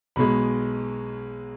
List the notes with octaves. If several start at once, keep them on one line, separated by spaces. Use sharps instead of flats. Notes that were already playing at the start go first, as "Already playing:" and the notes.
B1 B2 G#3 B5